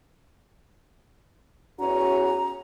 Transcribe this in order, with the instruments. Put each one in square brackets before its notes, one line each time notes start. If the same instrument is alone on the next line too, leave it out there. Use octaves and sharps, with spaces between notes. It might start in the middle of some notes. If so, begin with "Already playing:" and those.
[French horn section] E2 C#4 F#4 [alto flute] A#5